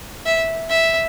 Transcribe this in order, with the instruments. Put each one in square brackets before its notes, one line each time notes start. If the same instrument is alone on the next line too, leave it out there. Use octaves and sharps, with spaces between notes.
[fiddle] E5
E5